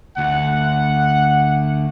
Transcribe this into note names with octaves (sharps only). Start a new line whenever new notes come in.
D2 F#5